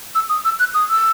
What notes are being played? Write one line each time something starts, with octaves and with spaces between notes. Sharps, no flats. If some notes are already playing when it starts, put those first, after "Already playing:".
E6
D#6
E6
F#6
D#6
E6